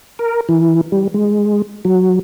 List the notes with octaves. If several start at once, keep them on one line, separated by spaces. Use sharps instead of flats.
A#4
E3
G3
G#3
F#3